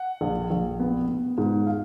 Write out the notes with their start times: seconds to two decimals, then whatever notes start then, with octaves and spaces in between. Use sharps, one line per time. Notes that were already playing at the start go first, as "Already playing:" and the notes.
Already playing: F#5
0.21 A#1
0.50 A#1
0.80 B3
1.08 B3
1.38 G#2
1.67 F5